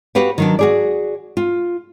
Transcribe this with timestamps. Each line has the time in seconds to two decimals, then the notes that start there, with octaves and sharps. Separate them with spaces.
0.15 F#4 G4 B4 F5 F#5
0.38 D#3 F#3 D4
0.59 F#4 G#4 D5
1.37 F4